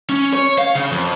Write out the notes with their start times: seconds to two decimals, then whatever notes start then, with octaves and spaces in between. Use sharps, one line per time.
0.10 C#4
0.33 C#5
0.58 F5
0.75 C#3
0.92 F2